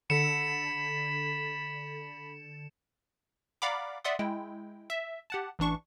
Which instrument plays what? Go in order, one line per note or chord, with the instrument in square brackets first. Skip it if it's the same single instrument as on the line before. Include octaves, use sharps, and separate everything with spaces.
[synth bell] D3 A4 [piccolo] B5 [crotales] C#7 E7
[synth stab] D5 F5 F#5 A#5 B5 D6
D5 E5 F#5 C6 D#6
G#3 E4 G5
E5
G4 F#5 A5
A1 E3 D4 C#6